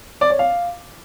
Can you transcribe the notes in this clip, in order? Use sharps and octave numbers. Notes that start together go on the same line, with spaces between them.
D5
C#5
F5